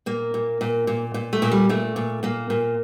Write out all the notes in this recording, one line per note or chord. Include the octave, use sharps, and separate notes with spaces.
A#2 A#3
A#2
A#2
A#2
A#2
A3
A#2
G3
A#2 A3
A#2
A#2 A#3
A#2